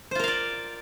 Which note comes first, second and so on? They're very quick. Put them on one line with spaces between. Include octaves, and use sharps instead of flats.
C5 F4 A#4 F5 D5